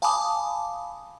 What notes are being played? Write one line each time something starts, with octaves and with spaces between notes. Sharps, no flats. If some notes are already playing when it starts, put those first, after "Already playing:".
F5 G#5 A5 B5 D6 D#6